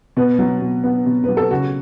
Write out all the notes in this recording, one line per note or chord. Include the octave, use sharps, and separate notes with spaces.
B2 B4
F#3
B2
B3
B2
F#3 B4
A4
C#3 F#4